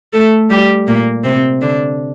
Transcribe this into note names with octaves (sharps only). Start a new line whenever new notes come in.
A3 A4
G3 G4
A#2 A#3
C3 C4
D3 D4